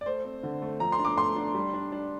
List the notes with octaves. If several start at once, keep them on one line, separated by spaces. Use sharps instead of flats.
D5
A3 C5
C4
D3
A3
F3 A#5
C6
D4
D6
A3 C6
D4
G3
D4
D4